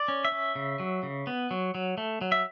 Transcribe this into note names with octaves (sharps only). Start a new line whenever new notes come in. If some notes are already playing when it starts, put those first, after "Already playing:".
Already playing: D5
C#4
E5
C#4
C#3
F#3
C#3
B3
F#3
F#3
A3
F#3
E5